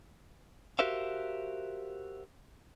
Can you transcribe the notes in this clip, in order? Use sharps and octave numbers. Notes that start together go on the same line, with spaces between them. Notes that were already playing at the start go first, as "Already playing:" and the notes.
F#4 G4 A#4 C5 E5 F5